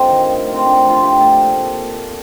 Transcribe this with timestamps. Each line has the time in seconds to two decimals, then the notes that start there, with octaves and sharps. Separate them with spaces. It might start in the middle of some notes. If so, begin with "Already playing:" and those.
Already playing: G2 C4 D#4 F4 A4
0.08 D#3
0.27 A2
0.47 F3
0.53 C4
0.65 A2 D4
0.84 F3
0.90 F4
1.03 A2 G4
1.21 F3 A4
1.41 A#2